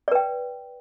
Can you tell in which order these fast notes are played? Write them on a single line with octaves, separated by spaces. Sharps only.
D5 B4 G5